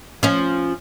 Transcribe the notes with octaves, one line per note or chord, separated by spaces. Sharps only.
F3 C#4